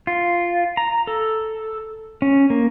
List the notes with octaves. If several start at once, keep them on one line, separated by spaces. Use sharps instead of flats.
F4
A#5
A4
C#4
A#3